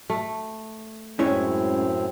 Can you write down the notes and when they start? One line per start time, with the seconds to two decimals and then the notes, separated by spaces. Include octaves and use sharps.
0.10 A3
1.19 F#2 A2 G#3 C4 C#4 E4 C#5